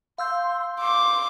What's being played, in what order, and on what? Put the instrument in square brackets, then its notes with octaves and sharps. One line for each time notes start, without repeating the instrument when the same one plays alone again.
[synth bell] F5 E6 G6 [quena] C6
[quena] C6 [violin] D6